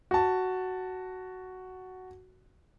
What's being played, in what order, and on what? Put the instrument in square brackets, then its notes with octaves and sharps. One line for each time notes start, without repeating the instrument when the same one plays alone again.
[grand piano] F#4 A5